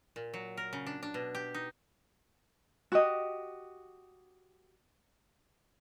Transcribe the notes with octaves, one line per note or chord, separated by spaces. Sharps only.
A#2
F#3
A#4
C#3
D4
D4
B2
G4
D#4
F#4 G4 D#5